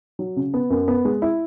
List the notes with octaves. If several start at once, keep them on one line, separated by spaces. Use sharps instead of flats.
F#3
C#3
B3
F#2
B3
G#3
E4